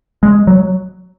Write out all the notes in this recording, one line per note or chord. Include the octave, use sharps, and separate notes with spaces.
G#3
F#3